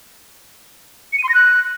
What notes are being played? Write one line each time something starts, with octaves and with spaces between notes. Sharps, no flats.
C#7
D#7
C6
A#6
F#6